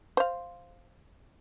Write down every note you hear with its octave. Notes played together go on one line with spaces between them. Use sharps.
C5 F5